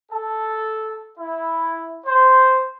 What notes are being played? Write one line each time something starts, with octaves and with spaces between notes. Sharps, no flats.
A4
E4
C5